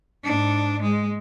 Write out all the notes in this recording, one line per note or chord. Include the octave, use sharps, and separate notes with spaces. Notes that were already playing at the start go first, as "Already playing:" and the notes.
G#2 D4
G#3